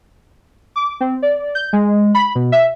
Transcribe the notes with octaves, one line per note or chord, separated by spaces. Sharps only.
D6
C4
D5
G6
G#3
B5
B2
E5